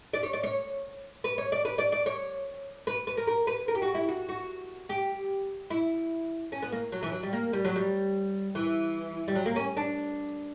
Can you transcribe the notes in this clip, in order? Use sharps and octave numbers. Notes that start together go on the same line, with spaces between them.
D5
C#5
D5
C#5
B4
C#5
D5
B4
D5
D5
C#5
B4
B4
A#4
A#4
B4
A#4
G4
F#4
E4
F#4
F#4
G4
E4
C#4
B3
A#3
F#3
E3
F#3
G3
A#3
G3
F#3
G3
E3
G3
F#3
A#3
C#4
D4